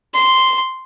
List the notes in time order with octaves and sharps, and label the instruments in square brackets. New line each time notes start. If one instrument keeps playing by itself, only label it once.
[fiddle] C6